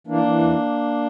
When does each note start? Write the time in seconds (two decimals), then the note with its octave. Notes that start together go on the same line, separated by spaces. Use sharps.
0.07 E3 A#3 D4
0.23 E3
0.39 E2